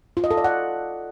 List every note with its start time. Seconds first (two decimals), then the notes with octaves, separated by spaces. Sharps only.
0.17 F4
0.24 D#5
0.31 A4
0.37 D5
0.44 F#5